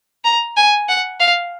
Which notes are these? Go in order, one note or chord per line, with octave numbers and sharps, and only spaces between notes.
A#5
G#5
F#5
F5